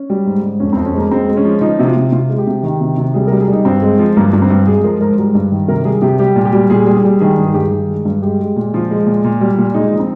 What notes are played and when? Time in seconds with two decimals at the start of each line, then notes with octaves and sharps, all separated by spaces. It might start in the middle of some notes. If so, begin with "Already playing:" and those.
Already playing: C#4
0.10 G3
0.26 G#2
0.43 G#2
0.60 F2 C#4
0.73 C4
0.77 F2
0.86 C#4
0.94 G#3 A#3
1.11 G#3 C4
1.29 G#3
1.37 C#4
1.45 F3
1.61 F3 D#4
1.79 C3
1.87 F4
1.96 C3
2.12 C3 F4
2.29 G#3
2.38 G4
2.47 C3
2.63 D#3
2.81 C3
2.98 C3
3.14 G3 G#4
3.27 A#4
3.32 G3
3.40 G#4
3.48 G3 D#4
3.65 G2 C4
3.82 G#3
3.99 F3
4.17 G2 A#3
4.33 G2
4.42 C4
4.50 G2
4.66 G#3 G#4
4.83 F3 A#4
5.01 G#2 A#4
5.18 G3 G#4
5.35 G2
5.52 D#3
5.68 C3 A#4
5.85 G3 G#4
6.02 C3 G4
6.19 G3 G4
6.36 A#2
6.45 G4
6.53 G3
6.70 A#2 G#4
6.87 G3
6.95 G#4
7.05 G3
7.20 D#3 G#4
7.38 G2
7.46 G#4
7.54 G2 G4
7.62 G#4
7.71 D#3
7.89 G#3
8.05 G2
8.22 G#3 G4
8.39 G#3
8.56 A#2
8.74 F3 F4
8.90 G#3
9.07 A#2
9.24 A#2
9.41 G3
9.58 A#2
9.74 G#3 D#4
9.92 F3
10.00 C4